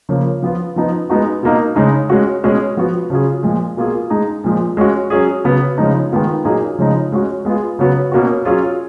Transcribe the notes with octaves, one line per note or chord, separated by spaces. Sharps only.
C#3 F3 A#3
F3 B3 F4
F3 B3 D#4
G#3 B3 D#4 F#4
B2 A#3 D#4
C#3 G#3 D#4
G#3 C#4 F#4
B2 G#3 C#4 G#4
F3 B3 F#4
C#3 F#3 C#4 F4 G#4
A#2 F3 G#3
B2 A#3 F4 G#4
G#3 D#4 G#4
A#2 F3 G#3
G#3 C#4 F#4
F#3 C#4 G#4
C#3 F#3 B3
C#3 F3 G#3 D#4
D#3 G#3 B3 F4
A#2 F#3 A#3 D#4 G#4
C#3 F3 G#3 D#4
G#3 C#4 F#4
G#3 B3 F4 G#4
C#3 F#3 B3 F#4
B2 A#3 C#4 F#4
F#3 C#4 F4 G#4